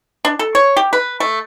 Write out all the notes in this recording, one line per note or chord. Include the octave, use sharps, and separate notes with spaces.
D4
A4
C#5
G4
B4
A3